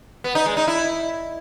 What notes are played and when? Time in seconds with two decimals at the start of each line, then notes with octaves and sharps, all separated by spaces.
0.24 B3
0.35 D#4
0.46 G#3
0.57 D#4
0.68 E4